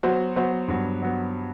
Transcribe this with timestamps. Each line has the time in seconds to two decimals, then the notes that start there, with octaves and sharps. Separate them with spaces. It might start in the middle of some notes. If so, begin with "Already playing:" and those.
0.03 F#3 B3 F#4 C5
0.36 F#3 B3 F#4 C5
0.68 G2 F#3 B3
1.02 F#3 B3